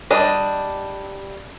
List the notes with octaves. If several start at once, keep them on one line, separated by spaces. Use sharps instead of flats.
G3 D4 D#5